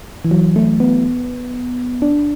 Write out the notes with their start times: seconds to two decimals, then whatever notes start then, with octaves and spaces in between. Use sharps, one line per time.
0.24 E3
0.31 F#3
0.56 A3
0.80 B3
2.02 D4